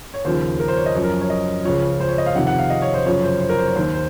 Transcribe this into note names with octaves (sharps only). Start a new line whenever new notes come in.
C#5
D#2 C#3 F3 C5
A#4
C5
C#5
D#5
F#2 F3 C#5
A#4
C#5
D#5
C#2 C#3 F3 C#5
C5
C#5
D#5
F5
F2 C3 D#3 F#5
F#5
F5
D#5
C#5
C5
F#2 C#3 F3 C#5
C5
C5
A#4
C5
C#5
D#2 D#3 C5
C5